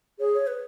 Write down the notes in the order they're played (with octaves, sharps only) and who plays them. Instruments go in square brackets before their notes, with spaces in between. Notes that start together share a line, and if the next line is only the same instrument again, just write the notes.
[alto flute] G#4 [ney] C#5
[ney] C#5
B4